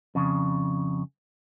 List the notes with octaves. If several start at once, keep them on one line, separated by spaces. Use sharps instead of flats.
F2 C#3